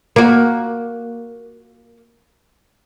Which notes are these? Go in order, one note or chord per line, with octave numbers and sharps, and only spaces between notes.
A#3 F#4